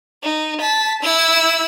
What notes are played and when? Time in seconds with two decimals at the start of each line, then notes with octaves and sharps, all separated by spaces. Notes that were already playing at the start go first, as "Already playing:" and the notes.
0.23 D#4
0.61 A5 B6
1.03 E4 E6